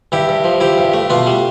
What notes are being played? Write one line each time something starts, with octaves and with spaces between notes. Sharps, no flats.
G2 E4 G4
G2
F3
F3 E4 G4
G2
A3
B2 D4 F4
G3